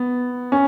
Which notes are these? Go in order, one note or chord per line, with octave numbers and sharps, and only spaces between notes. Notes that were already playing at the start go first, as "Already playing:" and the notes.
Already playing: B3
C#4